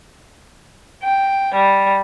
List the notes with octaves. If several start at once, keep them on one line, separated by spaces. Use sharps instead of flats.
G5
G3